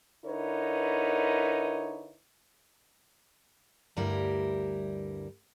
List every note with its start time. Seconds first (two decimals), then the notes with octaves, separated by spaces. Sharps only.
0.25 D3 D#4 E4 A#4 B4 C#5
3.97 D2 G2 G3 E4 A#4